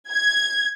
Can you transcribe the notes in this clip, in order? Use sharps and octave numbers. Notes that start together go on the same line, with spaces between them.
G#6